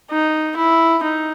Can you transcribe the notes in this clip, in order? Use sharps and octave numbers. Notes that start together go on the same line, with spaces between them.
D#4
E4
D#4